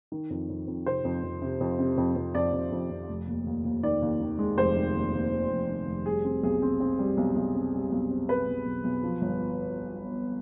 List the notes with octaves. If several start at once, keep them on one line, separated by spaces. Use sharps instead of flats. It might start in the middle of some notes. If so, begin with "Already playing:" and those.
D#3
F2
F2
F2
C3 C5
F2
F2
C3
F2
C3
F2
F2
F2 D5
F2
F2
F2
F1
D#2
D#2
D#2
D#3 D5
D#2
D#3
G#3
F1 C5
D#3
D#2
D#2
D#2
F1
D#3
F1
G3 G#4
C4
B1 G#4
C4
C4
G3
B1
B1
C4
G3
B1
C4
B2 B4
B1
B1
B1
F3
G1